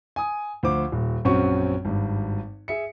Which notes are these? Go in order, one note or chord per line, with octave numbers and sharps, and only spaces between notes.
G#5 D#6
D2 F3 C5 D6
D#1
A#1 F#2 C4 C#4 F#4 C#6
G#1 G2
G#4 E5 C#7